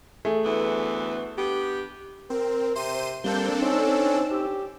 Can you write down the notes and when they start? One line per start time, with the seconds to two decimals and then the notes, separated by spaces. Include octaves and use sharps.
0.25 A3 G#4
0.45 D2 E3 B3
1.38 B3 D4 G4
2.30 C4 A#4
2.75 C3 C5 C6 D#7
3.24 G3 A#3 C4 D4 A4 G6
3.62 C#4 D#4 C5 E6
4.31 G4